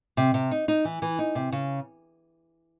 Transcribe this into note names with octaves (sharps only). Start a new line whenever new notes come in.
C3
C3
D#4
D#4
E3
E3
D#4
C3
C#3